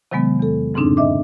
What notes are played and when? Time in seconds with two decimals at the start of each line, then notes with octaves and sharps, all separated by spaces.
0.11 C3 D#3 F#3 G#3 B3
0.39 E2 A4
0.74 F2 G#2 C#3 C4 D4 D#4
0.97 D#5 E5 D6